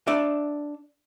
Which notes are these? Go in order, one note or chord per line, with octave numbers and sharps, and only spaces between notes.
D4 D5 E5